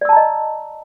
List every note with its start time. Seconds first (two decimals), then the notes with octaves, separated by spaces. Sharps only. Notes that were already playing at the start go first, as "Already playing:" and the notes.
0.01 D5
0.05 E6
0.09 A5
0.13 A#5
0.16 D#5